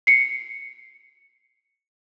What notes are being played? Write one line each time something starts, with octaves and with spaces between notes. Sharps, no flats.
C7 C#7